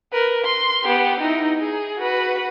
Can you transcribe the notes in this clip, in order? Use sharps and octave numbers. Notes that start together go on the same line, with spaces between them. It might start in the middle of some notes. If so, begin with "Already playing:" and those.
A#4 B4
C6
B3 G4
D#4 E4
G#4
F#4 B4